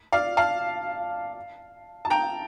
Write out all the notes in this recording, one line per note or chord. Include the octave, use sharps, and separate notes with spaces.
D5 F5
F5 A5
A5
G5 A#5